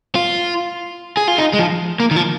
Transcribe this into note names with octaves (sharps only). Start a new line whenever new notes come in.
F4
G#4
F4
D#4
G#3
F3
A#3
D#3
F3